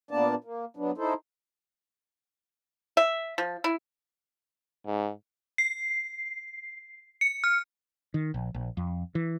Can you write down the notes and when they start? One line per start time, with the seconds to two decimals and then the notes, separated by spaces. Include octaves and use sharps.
0.11 A#2 A#3 B3 D4 D5 A5
0.44 A#3
0.77 F#3 B3 D4
0.98 D#4 E4 A4 C5
2.97 E5
3.38 F3
3.64 E4
4.86 G#2
5.58 C7
7.21 C#7
7.44 F6
8.14 D#3
8.34 A#1
8.54 A#1
8.77 F2
9.15 E3